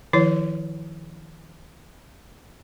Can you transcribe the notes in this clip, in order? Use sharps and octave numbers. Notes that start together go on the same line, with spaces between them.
D#3 F3 E4 C#5